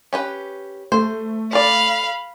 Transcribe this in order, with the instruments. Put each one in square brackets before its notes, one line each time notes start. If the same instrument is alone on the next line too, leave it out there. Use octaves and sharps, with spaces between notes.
[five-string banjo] C#4 G4 B4
[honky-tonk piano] A3 [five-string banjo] C5
[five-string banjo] A4 D5 [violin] F5 B5